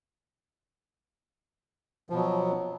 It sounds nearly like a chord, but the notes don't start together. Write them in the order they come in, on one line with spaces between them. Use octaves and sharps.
F3 B2 F#3